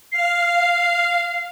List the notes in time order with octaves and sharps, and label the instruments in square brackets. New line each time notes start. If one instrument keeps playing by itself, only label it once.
[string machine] F5 [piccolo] C7